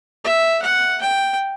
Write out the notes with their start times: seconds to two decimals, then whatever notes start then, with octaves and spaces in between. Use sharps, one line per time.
0.25 E5
0.62 F#5
1.01 G5